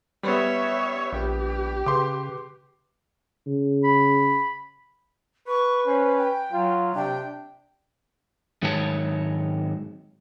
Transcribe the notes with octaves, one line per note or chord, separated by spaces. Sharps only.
G3 B3 C#5 E5
A#1 G4
C#3 B4 C6 D6
C#3
B5
B4 C#6
C#4 C5
G5
F#3 F4
C3 D4 G5
G#2 D#3 F#3 G#3 C#5 A5